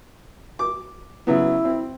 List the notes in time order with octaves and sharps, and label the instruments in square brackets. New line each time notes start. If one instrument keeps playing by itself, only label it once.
[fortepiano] D6
[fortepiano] C#3 F#3 B3 [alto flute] E4
[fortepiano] C4